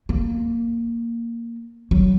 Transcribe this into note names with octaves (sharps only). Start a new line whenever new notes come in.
A#3
F#3